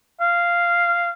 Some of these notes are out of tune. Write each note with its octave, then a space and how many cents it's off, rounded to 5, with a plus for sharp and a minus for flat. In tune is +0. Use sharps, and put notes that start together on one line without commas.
F5 -10